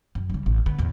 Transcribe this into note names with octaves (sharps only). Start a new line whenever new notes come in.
F#2
C#3 G3
A1
D3 B3
A1 E2